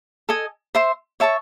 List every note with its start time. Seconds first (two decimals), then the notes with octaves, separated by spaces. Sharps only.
0.29 A4 D#5 G#5
0.75 C5 E5 C6
1.20 C#5 E5 A5 C#6